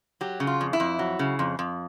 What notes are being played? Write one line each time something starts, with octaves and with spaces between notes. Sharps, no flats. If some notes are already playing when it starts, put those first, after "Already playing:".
F#3 G4
C#3
F4
F2
E4
F2
F#3
C#3
F2
F2